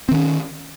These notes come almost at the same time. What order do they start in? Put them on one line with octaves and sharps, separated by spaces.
C4 D#3 C#4